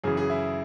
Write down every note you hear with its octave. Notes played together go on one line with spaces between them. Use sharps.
F#2 C#3 E3 G#4
G#4
E4